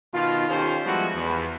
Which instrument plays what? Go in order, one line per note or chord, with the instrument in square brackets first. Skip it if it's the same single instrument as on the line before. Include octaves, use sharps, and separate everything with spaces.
[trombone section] B2 D#3 D#4 F4
D#3 C#4 F4 G4 A4 C5
F3 G3 G#3 B3 E4 F#4
E2